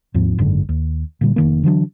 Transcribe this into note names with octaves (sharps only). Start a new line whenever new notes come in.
D#2 G#2 F3 C4
F#1 G#2 D3
D#2
A#2 D3 G3
F1 D#3 A#3
D3 E3 F#3 D4